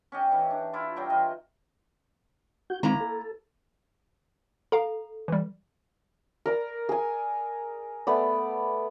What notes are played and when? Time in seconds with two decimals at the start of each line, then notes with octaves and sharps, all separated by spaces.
0.12 C#4 G4 D#5
0.31 E3 D#4
0.50 D4
0.73 E4 F4 D5
0.96 F#3 G3 G5 A#5
1.10 E3 F4 D#5
2.70 F#4 G6
2.83 D#3 G#3 A#3 C4 E4 A#5
3.00 A4
4.72 A4 F5 A#5
5.28 E3 G3
6.46 A#4 D5 A#5
6.89 G#4 G#5
8.07 A3 B3 D5